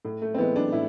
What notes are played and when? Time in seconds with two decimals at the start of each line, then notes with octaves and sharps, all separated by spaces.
0.05 A2
0.22 A3
0.34 C4
0.38 E3 G#3 B3
0.56 D4
0.72 A2 E4